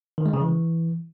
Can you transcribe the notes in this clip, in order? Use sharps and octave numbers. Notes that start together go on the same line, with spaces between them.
D#3
G#3
C#3
E3